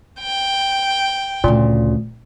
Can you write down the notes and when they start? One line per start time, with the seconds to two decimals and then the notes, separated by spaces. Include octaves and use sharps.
0.20 G5
1.44 D2 A#2 C#3